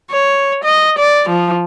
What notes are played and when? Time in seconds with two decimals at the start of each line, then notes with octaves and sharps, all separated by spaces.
0.11 C#5
0.64 D#5
0.99 D5
1.28 F3